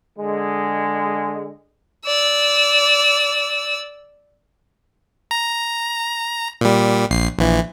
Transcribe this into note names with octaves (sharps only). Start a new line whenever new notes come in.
D3 G#3
D5 E6
A#5
A#2 G3
A#1 C7
A#1 E3